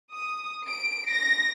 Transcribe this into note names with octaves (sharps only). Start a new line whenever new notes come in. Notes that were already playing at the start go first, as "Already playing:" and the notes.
D#6
D7
A#6